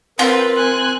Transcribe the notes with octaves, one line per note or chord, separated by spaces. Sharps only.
C4 F4 A#4 B4
G#5 F#6